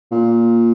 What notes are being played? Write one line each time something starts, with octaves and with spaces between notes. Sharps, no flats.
A#2